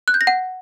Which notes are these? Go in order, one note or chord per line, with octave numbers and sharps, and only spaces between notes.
F#6
G6
A#6
F#5